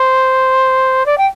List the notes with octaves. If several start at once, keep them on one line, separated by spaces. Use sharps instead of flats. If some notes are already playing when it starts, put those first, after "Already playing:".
Already playing: C5
D5
G5